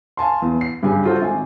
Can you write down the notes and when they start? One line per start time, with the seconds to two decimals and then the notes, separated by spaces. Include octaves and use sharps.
0.17 F5 G#5 A5 C6
0.42 E2
0.61 C7
0.83 G2 C#3 G3 G4 G#5
1.05 F4 F#4 A4 C5
1.22 G#1 G#5